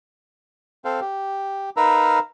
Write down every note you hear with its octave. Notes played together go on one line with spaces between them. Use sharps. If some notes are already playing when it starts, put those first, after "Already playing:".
C4 A4 C5 F5
G4
D#4 A#4 B4 F5 A#5 E6